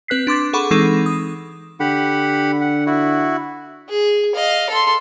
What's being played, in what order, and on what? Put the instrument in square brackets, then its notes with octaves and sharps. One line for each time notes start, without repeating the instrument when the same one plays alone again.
[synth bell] C4 B4 F#6 B6 C7
D4 C6 D6 A6
G#4 A4 F#5 B5 C#6 D6
E3 G#3 C4 D#4 A4 C#6
D#6
[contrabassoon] D3 [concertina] G4 F#5 B5
[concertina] F#5
E4 F#4
[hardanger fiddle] G#4
D#5 F5
A4 C6